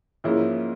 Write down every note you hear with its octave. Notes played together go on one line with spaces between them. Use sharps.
G#2 F3 A#3 C#4 E4